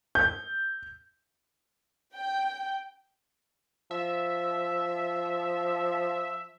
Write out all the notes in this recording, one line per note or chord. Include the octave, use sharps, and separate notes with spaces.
G6
G5
F3 E5